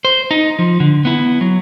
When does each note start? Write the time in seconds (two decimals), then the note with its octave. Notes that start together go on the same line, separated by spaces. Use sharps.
0.05 C5
0.31 D#4
0.59 F3
0.80 D3
1.05 B3 E4
1.41 F#3